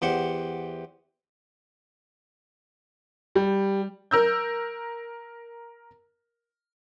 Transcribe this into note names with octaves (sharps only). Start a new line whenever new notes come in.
E2 G4 C5 F#5
G3
A#4 E6 G6